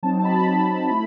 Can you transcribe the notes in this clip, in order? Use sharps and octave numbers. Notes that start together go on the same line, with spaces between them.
F#3 C4 D#4 A5
A5
B5
B5
A5
A3 E4 B5